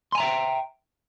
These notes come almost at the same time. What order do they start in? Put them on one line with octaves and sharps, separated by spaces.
C6 G#5 A#5 E5 G5